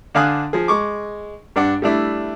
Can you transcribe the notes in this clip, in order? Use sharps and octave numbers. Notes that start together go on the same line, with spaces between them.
D3 D4 F5 G#5 D#6 F#6
F3 G#4
G#3 C#6 D6
G2 D4 F#5
G3 A3 D4 E4